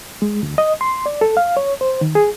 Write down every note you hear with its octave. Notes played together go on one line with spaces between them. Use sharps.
G#3
D2
D#5
C6
D5
A4
F5
C#5
C5
D#3
G#4